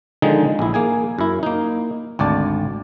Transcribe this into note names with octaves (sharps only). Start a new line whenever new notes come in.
D3 D#3 F3 G#3 D#4
A#1 E4
A#3 G#4 G#5
F#2 E4
A#3 D#4
G#1 D2 D5 A5